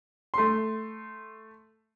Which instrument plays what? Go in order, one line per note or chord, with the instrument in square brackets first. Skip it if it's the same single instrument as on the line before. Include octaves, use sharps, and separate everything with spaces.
[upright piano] A3 C6